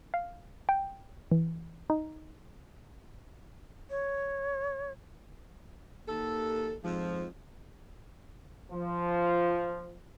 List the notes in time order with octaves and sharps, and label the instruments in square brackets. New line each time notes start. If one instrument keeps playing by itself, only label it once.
[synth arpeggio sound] F5
G5
E3
D#4
[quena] C#5
[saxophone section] D#2 A4
F2 G#2 F3
[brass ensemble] F3